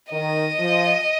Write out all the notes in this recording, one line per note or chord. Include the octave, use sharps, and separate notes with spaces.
D#3 D#5
F3